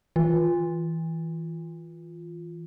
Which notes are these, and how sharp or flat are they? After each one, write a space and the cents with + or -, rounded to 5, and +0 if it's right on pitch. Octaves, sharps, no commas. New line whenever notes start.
E3 -20 F4 +0